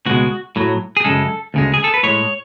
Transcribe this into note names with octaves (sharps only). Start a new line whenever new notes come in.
C#2 B2 G#3 F#4
A2 F#3
G#4
F#2 C#3 G#3 A4
D2 C#3 G#3
G#4
A4
B4
A2 G#3 C#5